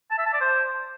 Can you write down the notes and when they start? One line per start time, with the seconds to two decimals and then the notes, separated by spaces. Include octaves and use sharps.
0.11 A5
0.18 E5
0.26 A5
0.33 D5
0.41 C5